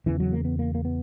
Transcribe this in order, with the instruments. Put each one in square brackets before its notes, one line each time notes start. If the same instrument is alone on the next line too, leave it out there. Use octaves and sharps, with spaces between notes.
[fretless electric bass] E2 C#3 E3
F#3
A#3
B3
A#3
A#3
B3